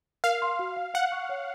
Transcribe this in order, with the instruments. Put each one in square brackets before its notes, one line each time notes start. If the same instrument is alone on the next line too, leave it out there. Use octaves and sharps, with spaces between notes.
[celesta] A#4 [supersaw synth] F5
[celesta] C6
F#4
F5
[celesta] F5 [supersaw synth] F#5
[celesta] C#6
C#5